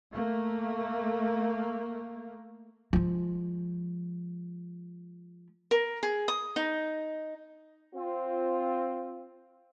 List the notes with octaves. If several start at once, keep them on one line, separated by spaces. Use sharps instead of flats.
A3 A#3
F3 G#3
A#4
G#4
D#6
D#4
C4 F4 C5